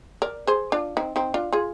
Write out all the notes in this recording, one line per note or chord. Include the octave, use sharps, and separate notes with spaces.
A#4 D5
G#4 C5
D4 F4
C4 D#4
C4 D#4
D4 F4
F4 G#4